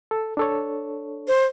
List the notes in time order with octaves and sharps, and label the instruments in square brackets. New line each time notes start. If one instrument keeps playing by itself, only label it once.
[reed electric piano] A4
D4 A4 C#5
[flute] C5